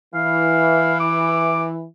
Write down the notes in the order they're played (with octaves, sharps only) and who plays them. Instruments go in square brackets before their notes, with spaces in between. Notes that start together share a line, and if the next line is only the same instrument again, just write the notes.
[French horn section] E3 [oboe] F5
[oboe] D6